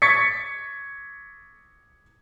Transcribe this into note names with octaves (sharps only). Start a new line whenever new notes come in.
C#6 G#6 A6 B6 C#7